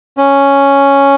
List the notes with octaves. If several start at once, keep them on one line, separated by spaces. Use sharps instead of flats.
C#4